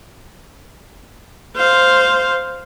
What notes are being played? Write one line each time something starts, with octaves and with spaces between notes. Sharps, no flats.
C5 F5